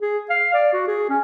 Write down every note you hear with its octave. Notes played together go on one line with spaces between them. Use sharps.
G#4
F5
D5
F#4
G#4
C#4